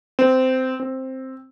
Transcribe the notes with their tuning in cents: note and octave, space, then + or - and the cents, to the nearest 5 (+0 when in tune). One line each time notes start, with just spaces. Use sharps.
C4 -15
C4 +5